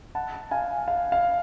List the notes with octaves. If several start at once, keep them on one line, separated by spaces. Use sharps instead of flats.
F#5 A5
F5 G#5
F5
F5